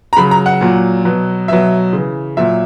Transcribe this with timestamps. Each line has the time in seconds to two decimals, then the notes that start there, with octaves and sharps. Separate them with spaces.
0.13 A#5
0.16 C#3 F#3 B5
0.31 A#5
0.46 F#5
0.61 A#2 F#3
1.05 B2 F#3
1.48 B2 F#3 E5
1.93 C#3 E3
2.37 A#2 F#3 E5